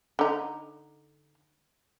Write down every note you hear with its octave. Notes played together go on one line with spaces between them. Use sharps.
D3 D#4